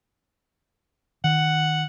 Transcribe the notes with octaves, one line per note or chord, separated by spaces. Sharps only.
D#3 F#5